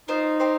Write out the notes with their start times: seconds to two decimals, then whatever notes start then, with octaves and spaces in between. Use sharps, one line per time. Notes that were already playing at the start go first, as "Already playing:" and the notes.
0.08 C4 D#4 F4 C5
0.40 C4 G4 C5